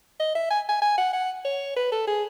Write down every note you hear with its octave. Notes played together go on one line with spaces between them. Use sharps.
D#5
E5
G#5
G#5
G#5
F#5
F#5
C#5
B4
A4
G#4